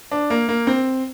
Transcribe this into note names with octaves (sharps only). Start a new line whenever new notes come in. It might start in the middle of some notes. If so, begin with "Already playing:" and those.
D4
A#3
A#3
C4